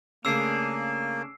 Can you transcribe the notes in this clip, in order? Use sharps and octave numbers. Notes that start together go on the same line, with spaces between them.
C#3 A3 A#3 C#4 D4 G#4 E6 C7